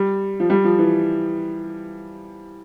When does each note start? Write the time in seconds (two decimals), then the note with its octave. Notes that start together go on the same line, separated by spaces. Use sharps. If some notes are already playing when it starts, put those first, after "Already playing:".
Already playing: G3
0.40 F3
0.50 G3
0.64 F3
0.79 E3